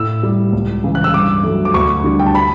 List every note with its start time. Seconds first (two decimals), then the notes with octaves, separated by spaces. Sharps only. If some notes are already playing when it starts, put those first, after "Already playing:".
Already playing: A2 E6
0.23 G3
0.53 C#2
0.84 C#3 E3
0.95 F#6
1.04 E6
1.13 G2 D6
1.43 F#3 A3
1.65 D6
1.74 D2 C#6
2.04 D3 G3
2.19 G5
2.26 A5
2.35 B5